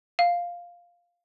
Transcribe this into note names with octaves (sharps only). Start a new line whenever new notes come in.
F5